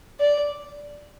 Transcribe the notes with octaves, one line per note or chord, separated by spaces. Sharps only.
D5